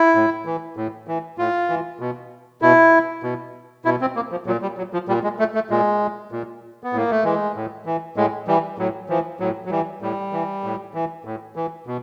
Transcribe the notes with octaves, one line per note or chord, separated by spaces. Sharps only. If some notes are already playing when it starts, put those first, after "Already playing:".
Already playing: E4
A2
E3
A2
E3
A2 F4
E3
B2
B2 E4
B2
B2 E4
C4
A#3
F3
A#2 F#3
G3
F#3
F3
A#2 G3
G#3
A3
A3
A#2 G#3
A#2
B3
A2 A#3
A3
E3 G#3
A2
E3
A2 G#3
E3 G3
A2 F#3
E3 F3
A2 F#3
F#3
E3 G3
A2 G3
E3
A2
E3
A2
E3
B2